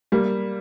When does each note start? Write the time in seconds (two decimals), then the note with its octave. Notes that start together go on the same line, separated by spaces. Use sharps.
0.12 G3 A#3